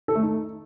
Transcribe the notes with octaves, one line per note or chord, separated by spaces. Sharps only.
A4
A3
D#4